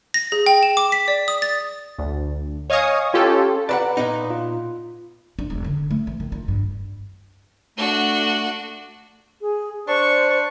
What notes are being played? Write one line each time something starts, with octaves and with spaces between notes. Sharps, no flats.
A#6
G#4
G5
E7
D6
B6
D5
D#6
A6
D2
C#5 D#5 F5 G#5 C#6 D#6
C#4 F4 G4 A4 C#5
B4 D5 E5 F#5 A#5 B5
A#2 B3 D#4
F4
D4
E1
D3
A3
E3
D#3
F4
G2
A3 D4 F#4
G#4
D4 C5 C#6